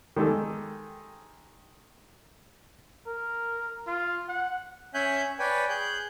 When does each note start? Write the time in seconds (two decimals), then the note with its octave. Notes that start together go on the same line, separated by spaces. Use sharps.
0.16 D#3 G#3 G4 A4
3.07 A#4
3.87 F4
4.29 F#5
4.94 C#4 C#5 E5 G#5 F#6 G6
5.39 B4 C#5 D5 G5 G#5
5.70 G#4 F#6 G6